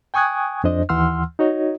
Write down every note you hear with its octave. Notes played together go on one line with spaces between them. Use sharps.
G5 G#5 C#6 D#6 F#6 G#6
F2 D4 C5 D#5
D#2 E3 F#5 C6 E6 F6
D#4 F#4 C#5 D#5